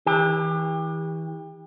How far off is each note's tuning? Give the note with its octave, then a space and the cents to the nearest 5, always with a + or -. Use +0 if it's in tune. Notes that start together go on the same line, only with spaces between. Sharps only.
E3 -30 G4 +30